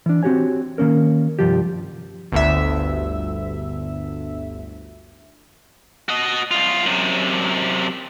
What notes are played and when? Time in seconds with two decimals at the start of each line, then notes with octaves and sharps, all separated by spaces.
0.06 E3 D4
0.23 C4 F#4 G4 C#5 G#5
0.78 D#3 A#3 C#4 A#4
1.39 C2 G2 F3 F4 G4
2.32 G1 D2 E5
6.09 F#4 D#5
6.51 C2 F4
6.86 F#2 C3